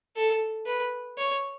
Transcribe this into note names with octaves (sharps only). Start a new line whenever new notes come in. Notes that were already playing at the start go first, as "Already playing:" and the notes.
A4
B4
C#5